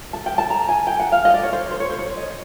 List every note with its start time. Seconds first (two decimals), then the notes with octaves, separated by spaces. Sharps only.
0.13 A5
0.26 G5
0.38 A5
0.50 A#5
0.69 G#5
0.87 G5
1.00 F#5
1.12 F5
1.25 D#5
1.34 D5
1.43 C#5
1.53 C5
1.71 C5
1.80 C#5
1.90 C5
1.99 C#5
2.17 D#5